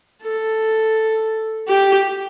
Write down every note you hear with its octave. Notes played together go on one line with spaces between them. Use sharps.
A4
G4